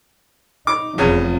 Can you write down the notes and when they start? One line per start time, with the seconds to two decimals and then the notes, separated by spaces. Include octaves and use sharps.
0.67 D#4 D6
0.98 F1 E2 C#3 F3